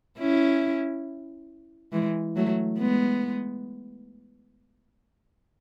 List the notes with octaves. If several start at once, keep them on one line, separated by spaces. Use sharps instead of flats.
C#4 E4
E3 G#3
F#3 A3
G#3 B3